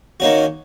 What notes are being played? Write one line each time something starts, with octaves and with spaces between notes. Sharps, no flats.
D#3 A#3 C#4 F#4